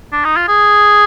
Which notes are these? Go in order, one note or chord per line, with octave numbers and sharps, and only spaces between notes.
D4
D#4
F4
G#4